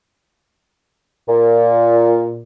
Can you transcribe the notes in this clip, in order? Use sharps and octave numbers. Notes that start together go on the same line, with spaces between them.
A#2